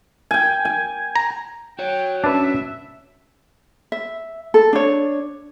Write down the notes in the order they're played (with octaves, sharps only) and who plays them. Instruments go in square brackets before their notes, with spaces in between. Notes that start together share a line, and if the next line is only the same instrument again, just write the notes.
[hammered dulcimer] G5 G#5
G#5
[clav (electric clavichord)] A#5
[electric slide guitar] F#4 C#5 [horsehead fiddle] G5
[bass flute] C#4 [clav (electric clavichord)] D4 B4 [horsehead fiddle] E5
[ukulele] E5
A4
D4 C#5